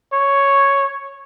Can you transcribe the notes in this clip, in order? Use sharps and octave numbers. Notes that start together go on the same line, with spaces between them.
C#5